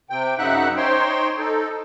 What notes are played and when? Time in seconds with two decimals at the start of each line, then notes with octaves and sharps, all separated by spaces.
0.10 C3 G5
0.39 F#2 C#3 D#4 E5 F#5 F#6
0.77 D#4 C5 C#5 G5 C6
1.38 D#4 A4